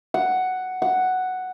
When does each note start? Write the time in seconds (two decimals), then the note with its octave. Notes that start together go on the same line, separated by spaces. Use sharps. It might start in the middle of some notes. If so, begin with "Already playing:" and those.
0.14 F#5
0.82 F#5